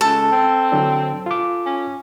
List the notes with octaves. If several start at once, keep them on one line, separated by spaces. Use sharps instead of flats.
C#2 A4
C4
D3 F#3 D4
F4 D6
C#4